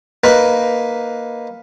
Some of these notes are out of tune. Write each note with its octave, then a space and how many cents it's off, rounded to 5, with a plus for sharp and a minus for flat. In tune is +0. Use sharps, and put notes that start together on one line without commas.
A#3 +5 D#4 +0 B4 +0